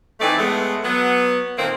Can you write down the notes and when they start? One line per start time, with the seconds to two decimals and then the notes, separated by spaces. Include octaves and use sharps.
0.20 E3 A3 C4 D#4 D5
0.38 A2 G#3 A3 B3
0.83 F#3 B3
1.57 A#2 D#3 A3 A#3 C4